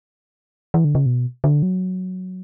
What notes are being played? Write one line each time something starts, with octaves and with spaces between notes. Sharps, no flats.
E3
D3
C#3
B2
D3
F#3